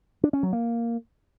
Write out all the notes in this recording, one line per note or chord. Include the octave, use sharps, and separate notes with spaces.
D4
C#4
F#3
A#3